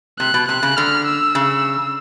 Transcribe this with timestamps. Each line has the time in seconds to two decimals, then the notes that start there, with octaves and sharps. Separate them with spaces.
0.19 C3 F#6
0.34 B2
0.48 C3 F#6
0.63 C#3
0.77 D3 F6
1.07 E6
1.35 C#3